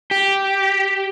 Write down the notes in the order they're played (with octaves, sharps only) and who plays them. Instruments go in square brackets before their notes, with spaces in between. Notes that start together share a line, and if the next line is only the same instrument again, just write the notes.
[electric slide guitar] G4